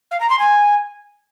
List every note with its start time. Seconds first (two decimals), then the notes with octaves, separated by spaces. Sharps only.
0.11 F5
0.20 A#5
0.29 C6
0.38 G#5